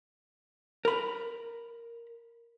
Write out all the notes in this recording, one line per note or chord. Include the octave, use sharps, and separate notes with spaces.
A#4 B5